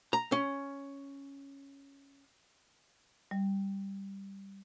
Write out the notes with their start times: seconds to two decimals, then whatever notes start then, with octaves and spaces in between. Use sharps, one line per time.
0.13 A#5
0.32 C#4
3.31 G3